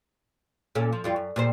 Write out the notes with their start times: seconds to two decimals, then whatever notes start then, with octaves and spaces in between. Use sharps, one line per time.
0.75 A#2 C#4 A4
0.93 F3
1.04 F2 G3 F4
1.16 F#2
1.36 A#2 G3 C5